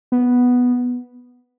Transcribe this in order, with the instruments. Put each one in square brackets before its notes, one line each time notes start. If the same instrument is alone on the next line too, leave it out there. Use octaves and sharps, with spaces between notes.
[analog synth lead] B3